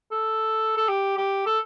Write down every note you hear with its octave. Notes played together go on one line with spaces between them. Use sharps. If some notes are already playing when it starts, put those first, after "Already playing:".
A4
A4
G4
G4
A4